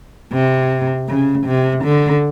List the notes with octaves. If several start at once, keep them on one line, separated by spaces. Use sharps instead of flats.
C3
C#3
C3
D3